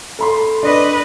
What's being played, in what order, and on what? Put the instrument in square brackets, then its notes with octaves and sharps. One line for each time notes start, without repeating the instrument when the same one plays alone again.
[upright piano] A4 B5 C6
[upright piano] D4 [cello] B4 D#5